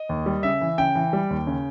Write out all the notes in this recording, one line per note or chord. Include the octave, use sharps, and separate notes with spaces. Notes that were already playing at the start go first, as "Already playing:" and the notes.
Already playing: D#5
D#2
G3
C#3 E5
E3
C#3 G5
E3
G3
D#2
C#3